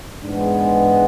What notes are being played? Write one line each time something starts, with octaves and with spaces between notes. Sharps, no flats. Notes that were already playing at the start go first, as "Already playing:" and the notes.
G#2 E3 G#3 B3 D4